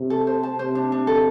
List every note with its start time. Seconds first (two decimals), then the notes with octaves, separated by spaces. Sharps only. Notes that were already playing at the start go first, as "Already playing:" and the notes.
Already playing: C3
0.10 A4
0.27 C5
0.43 A5
0.59 C3 C5
0.75 D4
0.92 D4
1.07 A4